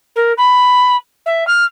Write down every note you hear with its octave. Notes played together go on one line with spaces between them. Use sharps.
A#4
B5
E5
F6